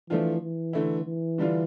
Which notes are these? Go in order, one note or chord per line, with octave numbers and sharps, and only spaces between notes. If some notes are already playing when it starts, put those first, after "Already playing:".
E3 F3 A3 D4 F4
E3
D3 A3 E4
E3
D3 G3 D4 F4